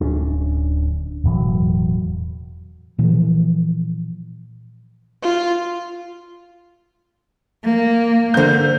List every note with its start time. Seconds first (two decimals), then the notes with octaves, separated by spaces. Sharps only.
0.01 D1 C#4 D4
1.24 E1 A2 E3 F#3
2.98 A#2 E3 F3
5.23 F4
7.65 A#3
8.34 D3 A#3 C5 G6